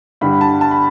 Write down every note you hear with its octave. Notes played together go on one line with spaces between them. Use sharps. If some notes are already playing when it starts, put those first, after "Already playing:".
G2 D3 G3 B5
A5
A5
B5